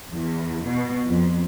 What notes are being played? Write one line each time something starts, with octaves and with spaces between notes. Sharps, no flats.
E2
B2
F2